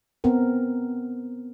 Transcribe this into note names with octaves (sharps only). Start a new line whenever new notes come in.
B3 C4 A#4